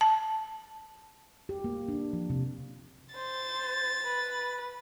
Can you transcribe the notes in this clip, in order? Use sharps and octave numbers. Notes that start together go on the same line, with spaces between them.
A5
G4
A#3
D4
F3
C3
C5 A6
B4